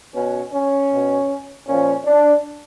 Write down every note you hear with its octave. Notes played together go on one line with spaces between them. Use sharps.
B2 C#4
C#4
B2
A#2 F3 C#4
D4